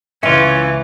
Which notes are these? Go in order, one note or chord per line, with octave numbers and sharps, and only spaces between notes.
C#2 G#2 E3 C#4 F4 E5